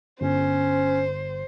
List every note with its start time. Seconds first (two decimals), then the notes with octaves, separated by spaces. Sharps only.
0.21 G1 C#4 C5